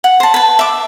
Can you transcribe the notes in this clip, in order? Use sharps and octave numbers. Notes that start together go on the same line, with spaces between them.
F#5
C5 A5
B4 A5
E5 D6